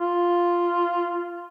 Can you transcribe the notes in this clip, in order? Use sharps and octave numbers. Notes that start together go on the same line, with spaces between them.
F4